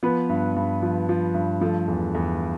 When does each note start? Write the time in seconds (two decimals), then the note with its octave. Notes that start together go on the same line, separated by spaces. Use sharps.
0.03 F3 B3 B4
0.29 G2
0.56 G2
0.82 F3
1.09 F3
1.34 G2
1.61 F3 A3 A4
1.88 E2
2.15 E2